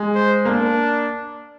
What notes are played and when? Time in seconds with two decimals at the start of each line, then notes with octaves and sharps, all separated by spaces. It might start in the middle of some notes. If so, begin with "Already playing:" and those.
Already playing: G#3
0.15 C5
0.45 A#3 D4